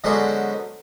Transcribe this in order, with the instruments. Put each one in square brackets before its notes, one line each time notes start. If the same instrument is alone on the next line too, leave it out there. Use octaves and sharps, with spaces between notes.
[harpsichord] D3 F#3 G#3 B3 C#4 C5